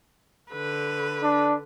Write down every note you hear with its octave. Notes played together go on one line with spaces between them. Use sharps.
D3 B4
D4